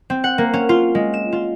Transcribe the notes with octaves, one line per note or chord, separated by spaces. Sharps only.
C4
F#5
A#3
C#4
F4
G#3
E7
F4